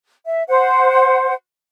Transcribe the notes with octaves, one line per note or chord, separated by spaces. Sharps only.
E5
C5 F#5